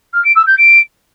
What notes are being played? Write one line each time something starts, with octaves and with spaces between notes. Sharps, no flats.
F6
D7
E6
G6
D7